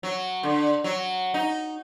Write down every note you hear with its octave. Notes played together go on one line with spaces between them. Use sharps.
F#3
D3
F#3
D#4